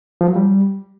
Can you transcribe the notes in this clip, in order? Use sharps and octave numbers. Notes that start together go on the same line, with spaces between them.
F3
F#3
G3